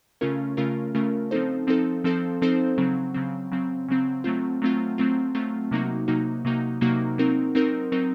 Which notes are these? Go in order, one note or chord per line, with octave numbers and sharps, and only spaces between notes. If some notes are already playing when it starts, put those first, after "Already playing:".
C#3 A3 C#4 F4 A#4
C#3 A3 C#4 F4 A#4
C#3 A3 C#4 F4 A#4
F3 C4 D#4 A4 C5
F3 C4 D#4 A4 C5
F3 C4 D#4 A4 C5
F3 C4 D#4 A4 C5
C#3 F#3 C4
C#3 F#3 C4
C#3 F#3 C4
C#3 F#3 C4
F#3 A3 C4 F4
F#3 A3 C4 F4
F#3 A3 C4 F4
F#3 A3 C4 F4
C3 F#3 A#3 D#4 F#4
C3 F#3 A#3 D#4 F#4
C3 F#3 A#3 D#4 F#4
C3 F#3 A#3 D#4 F#4
F#3 C4 D#4 A#4
F#3 C4 D#4 A#4
F#3 C4 D#4 A#4